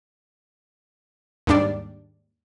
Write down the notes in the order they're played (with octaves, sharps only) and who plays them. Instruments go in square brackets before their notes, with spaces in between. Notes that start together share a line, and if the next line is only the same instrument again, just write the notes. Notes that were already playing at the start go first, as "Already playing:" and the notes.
[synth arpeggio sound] D#2 G#2 G3 D4 D5